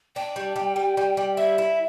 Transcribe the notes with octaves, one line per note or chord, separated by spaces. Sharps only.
D4 G5
G3
G3
G3
G3
G3
E4 E5
E4